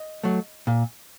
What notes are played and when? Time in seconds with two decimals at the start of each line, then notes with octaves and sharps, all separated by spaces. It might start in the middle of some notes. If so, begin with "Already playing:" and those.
Already playing: D#5
0.23 F#3 A3
0.67 A#2